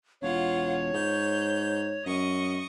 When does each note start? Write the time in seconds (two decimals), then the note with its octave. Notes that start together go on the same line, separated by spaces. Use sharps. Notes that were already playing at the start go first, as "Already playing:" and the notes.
0.22 E1 F4 C#5 F5 F#5
0.94 G#2 G6
2.06 F#2 D#5 C#6 D#6